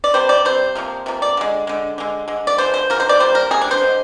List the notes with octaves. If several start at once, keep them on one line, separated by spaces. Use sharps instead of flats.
D5
C3 G3 C5
D5
C3 G3 C5
C3 F3 A#3
C3 F3 A#3
D5
D3 G#3
D3 G#3
D3 G#3
D3 G#3
D5
D3 F3 G#3 C5
C5
D3 F3 G#3 A#4
C5
D5
C3 G3 A#3 C5
A#4
C3 G3 A#3 G#4
D4
C5
D3 G#3